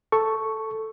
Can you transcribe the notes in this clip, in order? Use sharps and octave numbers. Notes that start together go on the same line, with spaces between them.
A4 C#6